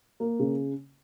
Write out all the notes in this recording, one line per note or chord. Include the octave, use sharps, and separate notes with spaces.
A#3
C#3